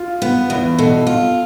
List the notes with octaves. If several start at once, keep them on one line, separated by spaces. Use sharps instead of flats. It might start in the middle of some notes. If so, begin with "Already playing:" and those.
Already playing: F4
B3
E2
B2 A4
F4